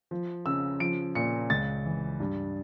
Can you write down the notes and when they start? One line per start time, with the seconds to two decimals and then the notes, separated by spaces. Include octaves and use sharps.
0.11 F3
0.46 C#3 E6
0.80 F3 D7
1.15 A#2 C#7
1.50 C#2 A6
1.85 E3
2.20 G2